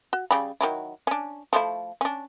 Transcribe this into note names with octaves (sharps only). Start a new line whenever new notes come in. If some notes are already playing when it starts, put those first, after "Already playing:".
F#4
C#3 G3 B5
D#3 F#3 E4
C#4 D4
F3 A3 E4
C#4 D4